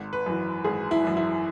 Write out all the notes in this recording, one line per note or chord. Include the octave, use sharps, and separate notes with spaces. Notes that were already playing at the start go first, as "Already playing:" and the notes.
Already playing: G#1
B4
F#2 E3
G#1 G#4
E4
F#2 E3
E4